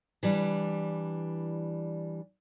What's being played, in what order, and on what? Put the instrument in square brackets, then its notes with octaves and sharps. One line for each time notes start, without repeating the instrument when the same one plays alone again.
[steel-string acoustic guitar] E3 G3 D4